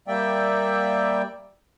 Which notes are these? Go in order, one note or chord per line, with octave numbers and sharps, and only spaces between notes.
G3 A#3 D5 E5 G5